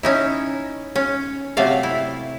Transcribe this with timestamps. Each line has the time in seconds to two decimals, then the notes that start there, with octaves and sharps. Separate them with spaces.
0.03 C#4 D#4 E4
0.95 C#4
1.57 C3 F#3 A3 D5 F5
1.83 E4